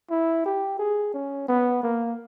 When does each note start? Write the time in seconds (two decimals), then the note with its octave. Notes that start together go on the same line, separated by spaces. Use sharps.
0.10 E4
0.45 G4
0.79 G#4
1.14 C#4
1.48 B3
1.83 A#3